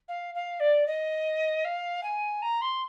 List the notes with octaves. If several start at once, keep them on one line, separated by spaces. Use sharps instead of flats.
F5
F5
D5
D#5
F5
G#5
A#5
C6